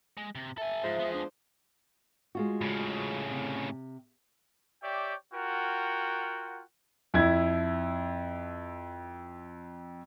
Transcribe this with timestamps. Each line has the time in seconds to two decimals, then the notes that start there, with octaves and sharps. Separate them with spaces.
0.17 G#3
0.35 C3
0.58 A4 E5 G#5
0.83 G#2 F3 G#3 C5
0.99 B3 G#4
1.13 D4
2.35 G#3 F4 F#4
2.61 A2 C#3
3.30 C3
4.83 G4 C#5 D5 E5 G5
5.34 F4 F#4 A#4 F#5 G5
7.14 F2 E4 G#6